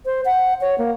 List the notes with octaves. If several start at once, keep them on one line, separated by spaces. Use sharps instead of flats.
C5
F#5
C#5
A#3